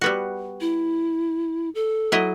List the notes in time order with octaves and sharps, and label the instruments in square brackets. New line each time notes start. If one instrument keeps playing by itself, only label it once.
[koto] G3 B3 F#4
[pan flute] E4
A4
[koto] F#3 E4 D#5